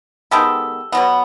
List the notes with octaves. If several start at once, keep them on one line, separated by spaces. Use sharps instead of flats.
D#3 G#3 B3 G4 A4
B2 F#3 B3